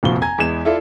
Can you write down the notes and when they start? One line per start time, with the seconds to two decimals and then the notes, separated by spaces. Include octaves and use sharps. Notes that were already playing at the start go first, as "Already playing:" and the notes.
0.03 F1 F2 A#2 F3 F#4 G7
0.22 G#5 A#5 G#6
0.38 E2 G#3 B3 G#6 E7
0.65 E4 F4 A4 D5 E5